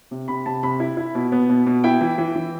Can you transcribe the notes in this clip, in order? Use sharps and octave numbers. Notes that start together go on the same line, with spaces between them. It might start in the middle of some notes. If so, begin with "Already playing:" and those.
C3
C3 B5
C3 A5
C3 B5
E4
E4
B2
B3
B2
B2
E4 G5
E3
E3
E3